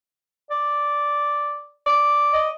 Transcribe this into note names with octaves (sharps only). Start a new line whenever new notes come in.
D5
D5
D#5